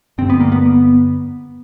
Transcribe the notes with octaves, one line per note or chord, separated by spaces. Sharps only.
G2 D3 C4
B3
A#3
B3